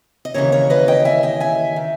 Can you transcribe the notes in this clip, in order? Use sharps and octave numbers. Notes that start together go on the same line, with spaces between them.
D#5
D#2 C#3 E3 A#4 C#5
A#4 C#5
B4 D#5
D#5 G5
E5 G#5
D#5 G5
E5 G#5
D#3